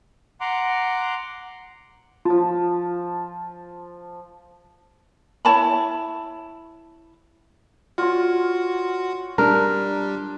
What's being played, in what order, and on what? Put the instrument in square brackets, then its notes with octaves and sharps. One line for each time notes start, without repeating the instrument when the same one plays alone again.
[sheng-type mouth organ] F#5 A#5 C6 D6
[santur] F3 A5 [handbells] F4
[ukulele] E4 C#5 A5 B5
[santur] F4 C#5 [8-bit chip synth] F#4
[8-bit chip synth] G3 [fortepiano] D4 [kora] A#4